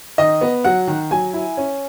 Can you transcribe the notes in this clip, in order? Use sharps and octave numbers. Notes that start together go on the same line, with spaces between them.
D#3 D#5
B3
F#3 F#5
D#3
F#3 G#5
E4
C#4